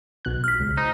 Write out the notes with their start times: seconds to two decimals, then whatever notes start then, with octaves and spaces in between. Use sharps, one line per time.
0.25 B1 B2 F#6
0.44 F6 B6
0.60 C#2
0.77 D#4 C5